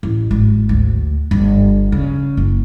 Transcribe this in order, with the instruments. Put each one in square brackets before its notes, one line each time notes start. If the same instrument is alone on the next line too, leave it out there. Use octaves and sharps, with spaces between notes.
[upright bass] A1
G#1
D2
G1
C#3
F#1